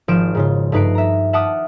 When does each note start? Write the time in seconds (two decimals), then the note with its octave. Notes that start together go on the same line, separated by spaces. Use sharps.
0.08 G#1 F3 F6 D7 E7
0.35 G#2 C#3 F4
0.72 G2 A3 D#4 B4 C7 D7
0.95 E5 A#5
1.33 E5 F#5 A5 D6 D#6 F6